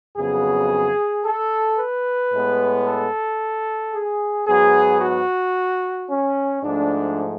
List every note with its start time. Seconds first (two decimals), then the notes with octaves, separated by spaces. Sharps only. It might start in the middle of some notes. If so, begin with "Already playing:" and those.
0.16 F2 C#3 F#3 B3 G#4
1.24 A4
1.78 B4
2.32 A2 G#3 B3
2.86 A4
3.93 G#4
4.47 G#2 F#3 B3 G#4
5.01 F#4
6.09 C#4
6.62 G#2 F3 A3 D4